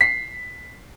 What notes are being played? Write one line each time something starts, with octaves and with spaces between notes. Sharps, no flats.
B6 C7